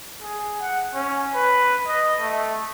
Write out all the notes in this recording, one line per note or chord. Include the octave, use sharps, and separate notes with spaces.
G#4
F#5
C#4
B4
D#5
A3